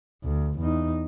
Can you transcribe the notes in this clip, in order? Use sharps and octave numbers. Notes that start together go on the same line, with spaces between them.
D2
E2 D#4